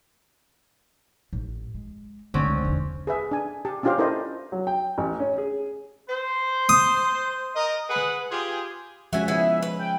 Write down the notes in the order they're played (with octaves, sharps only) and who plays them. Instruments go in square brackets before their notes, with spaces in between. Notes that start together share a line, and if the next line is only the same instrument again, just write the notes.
[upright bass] A1
G#3
[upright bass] C#2 A3 [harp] D3 C4 C#4
[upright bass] E2 C3
[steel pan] G#4 B4 E5
D4 G#5
G4 A5
C#4 D4 F4 G4 C5 F5
E4 A4 A#4 C5 D5 D#5
[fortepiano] F#3
G5
A1
C#4
G#4
[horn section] C5
[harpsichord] D#6
[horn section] A#4 D#5
G#4 B4 F#5
F4 G4 G#4
[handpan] F3 G#3 C#4 [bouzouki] F#4 G#5 [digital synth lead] E5
[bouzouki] B3 E4 G#4
B4
[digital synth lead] G5